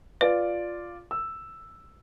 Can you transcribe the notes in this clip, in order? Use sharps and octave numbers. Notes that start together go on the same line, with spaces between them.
F4 B4 D5
E6